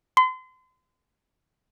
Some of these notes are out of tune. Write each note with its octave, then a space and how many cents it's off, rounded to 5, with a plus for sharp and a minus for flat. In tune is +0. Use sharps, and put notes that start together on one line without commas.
C6 -35